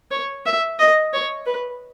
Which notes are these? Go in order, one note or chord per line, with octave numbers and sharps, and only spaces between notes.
C#5
E5
D#5
C#5
B4